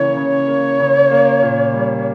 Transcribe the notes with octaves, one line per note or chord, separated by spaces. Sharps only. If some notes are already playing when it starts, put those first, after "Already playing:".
Already playing: C#3 E3 A#3 C#5
C#3
A#3
C#3
A#3
A#2
G3